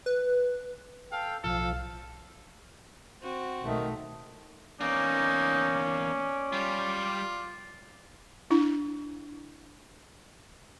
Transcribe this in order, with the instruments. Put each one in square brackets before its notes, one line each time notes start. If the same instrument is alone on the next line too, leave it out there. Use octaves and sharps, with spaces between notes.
[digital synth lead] B4
[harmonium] A4 G5 [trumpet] F5
[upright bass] B1 A2 [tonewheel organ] F3 [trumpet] A4 [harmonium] F5
[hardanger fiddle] C4 F#4
[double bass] B1 A3 [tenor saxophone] D#3
[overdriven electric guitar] E2 A#3 [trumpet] C#4 [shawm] D#4 [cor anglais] D5
[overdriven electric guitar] G3 [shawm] F4
[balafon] D4 E4